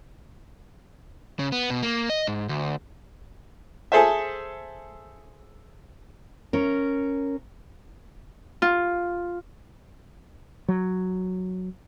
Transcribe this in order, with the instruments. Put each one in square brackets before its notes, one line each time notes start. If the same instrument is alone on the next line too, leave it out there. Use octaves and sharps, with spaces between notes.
[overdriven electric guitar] C#3
B3
B2
A#3
D#5
G#2
D2
[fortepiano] G#4 A4 C5 E5
[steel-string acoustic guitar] C#4 A#4
[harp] F4
[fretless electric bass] F#3